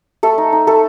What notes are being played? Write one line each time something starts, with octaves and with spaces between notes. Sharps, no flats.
A3 A4
D#4
D#4
A3 A4